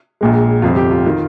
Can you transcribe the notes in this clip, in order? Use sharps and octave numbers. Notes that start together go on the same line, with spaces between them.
A#1 A#2 G#3
G1 F2 C3 G3 F4
G4
F4
D#3